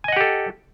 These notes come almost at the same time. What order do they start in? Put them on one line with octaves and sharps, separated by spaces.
G#5 D#5 F#5 G4 A4